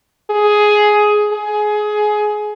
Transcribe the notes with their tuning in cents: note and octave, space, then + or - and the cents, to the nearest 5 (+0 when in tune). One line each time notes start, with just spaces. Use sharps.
G#4 +10
G#4 +20